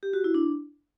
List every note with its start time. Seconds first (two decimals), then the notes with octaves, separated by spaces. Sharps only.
0.03 G4
0.13 F#4
0.24 E4
0.34 D4